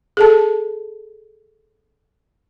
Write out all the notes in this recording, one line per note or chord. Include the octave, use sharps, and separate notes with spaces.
G#4 A4 A5